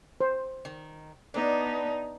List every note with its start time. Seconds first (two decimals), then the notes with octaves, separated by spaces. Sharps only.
0.21 C5
0.65 D#3
1.34 B3 D4 D#4